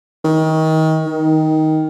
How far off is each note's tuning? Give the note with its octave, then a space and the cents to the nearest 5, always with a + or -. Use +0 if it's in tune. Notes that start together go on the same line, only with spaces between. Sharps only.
D#3 +30
D#3 +10